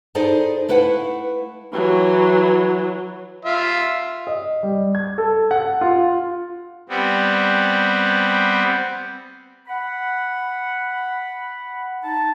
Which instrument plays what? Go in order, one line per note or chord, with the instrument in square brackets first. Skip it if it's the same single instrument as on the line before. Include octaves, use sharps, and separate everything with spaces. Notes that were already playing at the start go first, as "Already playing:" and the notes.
[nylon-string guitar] D#4 E4 G#4 A4 C5 D5
A3 E4 B4 F5 F#5
[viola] E3 F#3
[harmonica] F4 E5
[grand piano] D#5
G3
G#6
A4
F#5
F4
[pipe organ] G3 B3 C4
[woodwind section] F#5 B5
D#4 A5